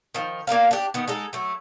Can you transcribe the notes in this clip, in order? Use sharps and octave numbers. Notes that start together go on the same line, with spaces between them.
D#3 F3
A#3 D4 A#4 F5
D4 G4
D#3 B3
G#3 D#4 A4
F#3 A3